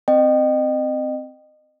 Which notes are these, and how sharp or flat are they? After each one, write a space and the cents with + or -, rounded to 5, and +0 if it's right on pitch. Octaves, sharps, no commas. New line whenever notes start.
C4 -5 D#5 -30 G5 -15